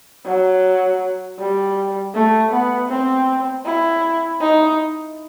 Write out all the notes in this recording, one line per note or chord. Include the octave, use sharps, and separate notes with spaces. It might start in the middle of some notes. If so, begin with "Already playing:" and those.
F#3
G3
A3
B3
C4
E4
D#4